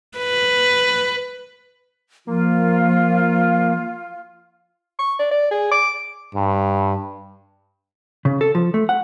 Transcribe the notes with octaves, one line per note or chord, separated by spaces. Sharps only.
B4
F3 A#3 F4
C#6
D5
D5
G#4
D6
G2
C#3
A4
F3
A3
F#5